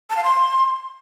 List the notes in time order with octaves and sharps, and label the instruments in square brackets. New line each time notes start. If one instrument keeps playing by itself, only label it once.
[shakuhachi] A5
F5
C6